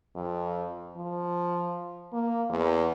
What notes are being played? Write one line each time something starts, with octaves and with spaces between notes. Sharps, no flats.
F2
F3
A#3
E2